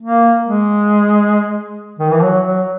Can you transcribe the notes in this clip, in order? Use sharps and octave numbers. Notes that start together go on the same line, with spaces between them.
A#3
G#3
D#3
E3
F#3
F#3